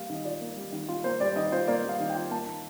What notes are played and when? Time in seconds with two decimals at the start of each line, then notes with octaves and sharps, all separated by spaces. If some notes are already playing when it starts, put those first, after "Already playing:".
Already playing: G3 A#3 F5
0.10 D#3 D#5
0.25 F4 D5
0.41 A#3
0.57 G3
0.72 D#3
0.89 F4
1.04 A#3 C5
1.20 G3 D5
1.36 D#3 D#5
1.52 F4 C5
1.67 A#3 D5
1.84 G3 F5
2.00 D#3
2.10 G5
2.16 F4
2.31 A#3 A5
2.47 D#3